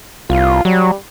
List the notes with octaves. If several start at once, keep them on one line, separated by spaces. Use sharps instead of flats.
C2 F4
F#3 G3